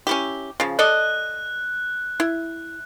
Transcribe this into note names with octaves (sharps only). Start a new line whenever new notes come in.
C#4 E4 G4
C#3 F3
A4 D5 D#5 F#6
E4